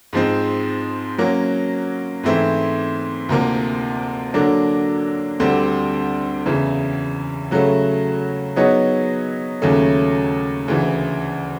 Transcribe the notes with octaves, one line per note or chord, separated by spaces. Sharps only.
G#2 F3 G#3 C4
F#3 A#3 C#4
G#2 E3 A3 C4 E4
D2 C3 F3 A#3
D3 F#3 A#3 D4
D2 D3 G3 C4
E2 C#3 E3
C#3 F#3 A3
F#3 B3 D#4 G#4 C#5
D#2 C#3 F#3 A3 C#4
D2 C#3 E3